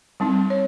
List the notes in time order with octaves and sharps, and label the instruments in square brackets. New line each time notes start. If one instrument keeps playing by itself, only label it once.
[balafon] G3 C4 D#4
C#5